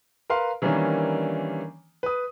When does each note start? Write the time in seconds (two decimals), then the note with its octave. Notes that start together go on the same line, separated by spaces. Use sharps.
0.30 A#4 B4 F5 C6
0.62 D#3 E3 G3 A#3 C#4 D4
2.03 B4 D#6